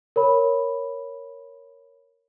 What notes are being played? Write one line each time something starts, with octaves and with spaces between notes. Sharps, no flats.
A#4 C#5 B5